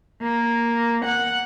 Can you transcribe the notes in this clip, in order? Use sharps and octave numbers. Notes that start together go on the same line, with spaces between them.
A#3
F#5